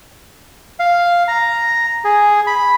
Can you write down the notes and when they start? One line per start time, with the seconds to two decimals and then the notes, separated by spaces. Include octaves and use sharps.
0.80 F5
1.28 A#5
2.05 G#4
2.47 B5